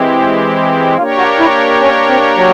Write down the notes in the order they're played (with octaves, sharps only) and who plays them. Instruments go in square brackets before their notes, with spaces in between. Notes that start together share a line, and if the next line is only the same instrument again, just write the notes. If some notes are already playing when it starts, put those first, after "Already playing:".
Already playing: [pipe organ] E3 G#3 C4 E4 G4
[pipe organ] A#3 D4 G4 A#4 C#5 [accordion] F4
[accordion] F#4
E4
C#4
C4
F#3